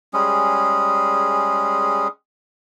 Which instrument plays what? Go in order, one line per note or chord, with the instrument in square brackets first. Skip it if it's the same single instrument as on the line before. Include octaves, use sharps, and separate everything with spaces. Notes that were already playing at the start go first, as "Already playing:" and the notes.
[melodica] G3 G#3 C#4 G#4